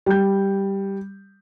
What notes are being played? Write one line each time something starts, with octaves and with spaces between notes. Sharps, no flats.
G3 G6